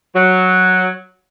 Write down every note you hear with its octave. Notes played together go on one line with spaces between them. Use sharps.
F#3